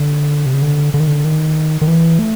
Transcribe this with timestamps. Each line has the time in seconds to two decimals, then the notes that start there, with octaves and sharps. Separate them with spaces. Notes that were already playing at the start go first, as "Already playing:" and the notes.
Already playing: D3
0.46 C3
0.54 C#3
0.62 D3
0.94 D3
1.00 D#3
1.08 D3
1.25 D#3
1.82 D#3
1.87 E3
2.19 A3